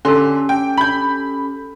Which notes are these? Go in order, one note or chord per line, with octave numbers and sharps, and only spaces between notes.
D3 C#4 G4 A4 C6
G5
B5 G6